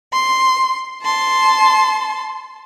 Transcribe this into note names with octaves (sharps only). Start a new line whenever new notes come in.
C6
A5 C6